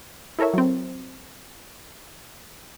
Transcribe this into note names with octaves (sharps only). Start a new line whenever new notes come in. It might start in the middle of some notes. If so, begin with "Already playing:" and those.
E4 A4 A#4 C#5 E5
F#3 C4